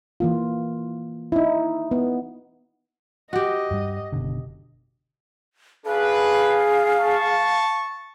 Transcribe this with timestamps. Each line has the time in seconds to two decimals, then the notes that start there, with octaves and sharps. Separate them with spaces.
0.20 E3 A#3 F4
1.32 D#4 E4
1.91 B3
3.33 F#4 G4 D#5
3.71 G2 G3
4.12 F#1 B2 D3
5.86 D4 F#4 G#4 B4 F5
7.00 A5 C#6